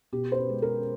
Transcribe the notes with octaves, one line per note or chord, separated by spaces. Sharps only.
B2 G4
C5
B4
G#3
A#4